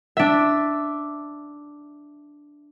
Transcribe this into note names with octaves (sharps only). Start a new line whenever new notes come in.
D4 E5